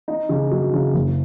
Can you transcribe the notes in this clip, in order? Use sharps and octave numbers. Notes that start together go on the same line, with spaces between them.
D#4
C#3
F#3
C#3
F#1